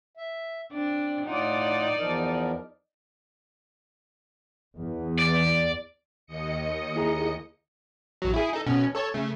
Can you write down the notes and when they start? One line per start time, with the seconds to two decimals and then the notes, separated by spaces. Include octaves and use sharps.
0.17 E5
0.72 C4 D4 D5
1.26 A2 D#4 F4 D5 F#5
1.99 E2 F3 A#4
4.76 E2
5.19 D5
6.27 D#2 D#5 C#7
6.96 E4 G#4 A#5
8.22 A1 F#3
8.34 E4 G#4
8.53 D#4 A4
8.66 B2 C#4
8.95 A4 C#5 A5
9.14 C#3 A3